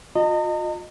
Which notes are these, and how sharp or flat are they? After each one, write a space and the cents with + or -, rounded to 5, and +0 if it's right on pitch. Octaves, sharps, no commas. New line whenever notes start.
F4 +35 D#5 -20 A#5 -45